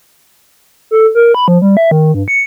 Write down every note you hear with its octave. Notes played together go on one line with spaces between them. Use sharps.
A4
A#4
B5
F3
G3
E5
D#3
G2
C#7